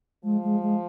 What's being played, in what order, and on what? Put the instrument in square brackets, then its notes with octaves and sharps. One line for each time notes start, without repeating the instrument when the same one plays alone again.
[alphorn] F3 [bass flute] G#3
[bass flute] G#3
G#3